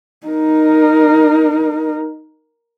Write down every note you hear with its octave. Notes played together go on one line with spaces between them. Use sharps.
D#4 A#4